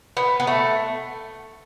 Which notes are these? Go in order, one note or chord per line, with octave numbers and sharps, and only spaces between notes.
B3
B3
A3